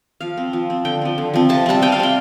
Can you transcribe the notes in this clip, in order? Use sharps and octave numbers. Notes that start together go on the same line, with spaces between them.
F3 F5
C4
F3
C4
D3 G5
F3 C4
D3
F3 C4
C3 A5
G3 C4 A5
C3 G5
F5
G3 C4 G5